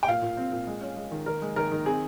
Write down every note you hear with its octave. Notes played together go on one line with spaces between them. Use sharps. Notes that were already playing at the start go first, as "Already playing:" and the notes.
G5
A#2 F5
A#2
C4
A#2
G#3
C#4
G#3
D#3
D#3 A#4
G#3
D#3 A#4
D#3
C4 G#4